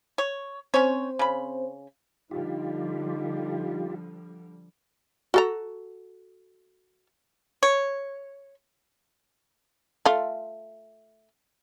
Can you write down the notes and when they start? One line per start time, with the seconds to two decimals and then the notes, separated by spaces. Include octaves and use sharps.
0.18 C#5
0.74 C4 C#4 C5 C#5
1.19 C#3 B5
2.31 D3 F3 G3 D#4 F4 G4
5.34 F#4 A4 A#5
7.63 C#5
10.06 A3 F4